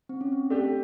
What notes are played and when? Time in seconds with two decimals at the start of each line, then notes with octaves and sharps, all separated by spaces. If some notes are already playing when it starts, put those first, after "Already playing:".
0.09 C4
0.21 C#4
0.32 C4
0.50 A3 D4 G4